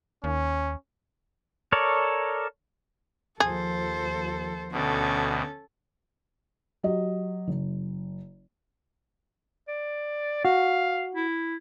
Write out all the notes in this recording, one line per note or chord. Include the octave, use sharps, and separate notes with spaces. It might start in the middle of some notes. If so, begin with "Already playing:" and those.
D#2 C#4
A4 A#4 C#5 D5
D#2 F3 G#4 A4 C5
D2 B2 C#4 A4
F#3 G4 D#5
F#1
D5
F#4 F5
E4